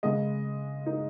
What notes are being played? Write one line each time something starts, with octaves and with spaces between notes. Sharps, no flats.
C#3 G#3 D#5
D#4